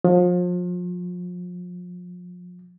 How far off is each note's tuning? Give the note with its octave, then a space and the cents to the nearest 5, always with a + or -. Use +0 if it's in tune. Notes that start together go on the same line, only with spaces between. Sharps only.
F3 +35